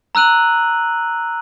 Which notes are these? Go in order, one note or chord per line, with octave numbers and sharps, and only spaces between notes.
A#5 E6 F#6 D#7 F#7